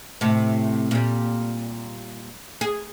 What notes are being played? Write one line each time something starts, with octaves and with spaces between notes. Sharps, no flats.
A2 C3
A#2 G3
G#4